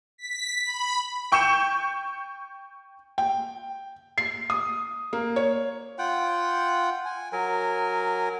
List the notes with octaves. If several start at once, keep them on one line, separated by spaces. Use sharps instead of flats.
B6
B5
G5 C#6 G6 C#7 E7
G5
C7
D#6
A#3
C#5
F4 F#5 G5
G#5
F#3 A#4 G#5